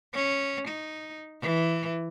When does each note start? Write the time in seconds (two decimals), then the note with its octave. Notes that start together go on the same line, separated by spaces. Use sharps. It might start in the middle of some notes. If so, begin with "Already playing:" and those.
0.14 C#4
0.68 D#4
1.42 E3